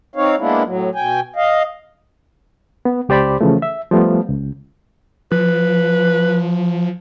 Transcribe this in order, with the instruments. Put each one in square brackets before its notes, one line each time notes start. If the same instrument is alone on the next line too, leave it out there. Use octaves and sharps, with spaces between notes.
[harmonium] C4 D#4 C#5 F5
G#3 A#3 B3 D4 E4
A2 F#3
B2 G5 G#5
D#5 F5
[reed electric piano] B3
C#2 G4 C5 D5 B5
C#3 E3 F3 A3
E5
F3 G3 A3 B3
C#2
[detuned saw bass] F3 [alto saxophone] B4